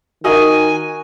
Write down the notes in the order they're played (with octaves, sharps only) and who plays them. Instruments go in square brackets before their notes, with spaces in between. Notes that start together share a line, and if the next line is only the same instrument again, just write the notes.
[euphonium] D#3 [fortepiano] F#4 A#4 D#5 [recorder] G#5